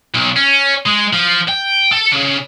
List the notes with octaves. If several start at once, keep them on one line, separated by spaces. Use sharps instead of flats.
B1
C#4
G#3
F3
G5
A4
C#3